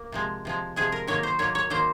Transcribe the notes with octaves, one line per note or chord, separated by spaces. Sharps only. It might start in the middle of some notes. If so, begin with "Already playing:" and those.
Already playing: A#3
C3 F3 G#3
C3 F3 G#3
C3 F3 G#3 G#4
A#4
D#3 F#3 A#3 C#5
C5
D#3 F#3 A#3 C#5
C#5
D#3 F#3 A#3 C5